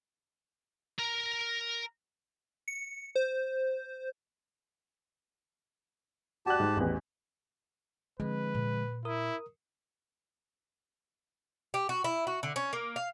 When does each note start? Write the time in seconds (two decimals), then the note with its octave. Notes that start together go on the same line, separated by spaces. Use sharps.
0.99 A#4 A#5
2.68 C#7
3.16 C5
6.46 F#4 G4 D5 A5 F#6
6.60 G#2
6.77 A1 E2
8.20 D3 F3 G#3 C4 B4
8.55 A#2
9.05 E4 A#4 D#6
11.74 G4
11.89 F#4
12.04 E4
12.27 F#4
12.43 D3
12.56 C#4
12.73 A#3
12.96 F5